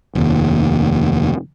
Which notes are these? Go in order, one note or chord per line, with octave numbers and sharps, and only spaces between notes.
F1 D#2